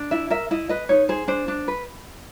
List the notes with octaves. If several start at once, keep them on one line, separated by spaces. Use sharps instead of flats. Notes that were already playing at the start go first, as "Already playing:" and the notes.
Already playing: D4
E4 E5
A#4 E5
E4 D#5
B4 D#5
D#4 C#5
G#4 C5
D4 C5
D4
B4